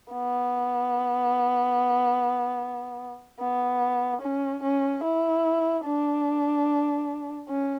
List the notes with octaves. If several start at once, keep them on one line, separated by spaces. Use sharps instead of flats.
B3
B3
C#4
C#4
E4
D4
C#4